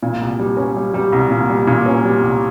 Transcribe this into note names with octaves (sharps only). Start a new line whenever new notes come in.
A#2
C2
G3
C#4
G3
G3
C2
A#2
G3
A#2
C#4
G3
C2